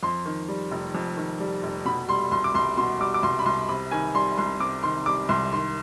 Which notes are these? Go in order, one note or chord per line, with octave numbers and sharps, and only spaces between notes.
F2 C6
D#3
G3
F1
F2
D#3
G3
F1
B2 B5
G3 C6
C2 C6
D6
C2 C6
B2 C6
G3 D6
D6
C2 C6
B5
C2 C6
C3 B5
D#3 G#5
G3 C6
C2 C6
C3 D6
D#3 C6
G3 D6
C2 C6
D#3 C6